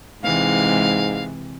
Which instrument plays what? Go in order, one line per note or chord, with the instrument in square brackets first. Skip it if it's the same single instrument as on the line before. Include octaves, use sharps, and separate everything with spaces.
[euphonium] G#2 [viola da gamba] C3 E3 G#3 [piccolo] F5